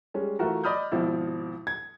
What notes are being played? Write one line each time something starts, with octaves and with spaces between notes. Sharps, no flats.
G3 G#3 C#4
E3 A3 F4 F#4 A#4
D5 D#5 B5 D#6 F6 G6
G#1 B2 F3 E4
G#6